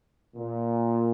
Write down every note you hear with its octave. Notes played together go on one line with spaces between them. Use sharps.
A#2